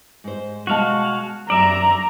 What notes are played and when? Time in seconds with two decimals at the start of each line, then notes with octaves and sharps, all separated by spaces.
0.24 G#2 C5
0.67 B2 G#3 F#4 F5 A5
1.50 F#2 D5 E5 A#5